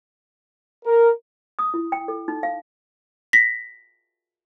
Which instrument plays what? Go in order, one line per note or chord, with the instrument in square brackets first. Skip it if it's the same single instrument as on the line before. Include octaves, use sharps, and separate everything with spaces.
[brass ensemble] A#4
[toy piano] D#6
E4
G5
A4
D#4
F5
[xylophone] A#6 B6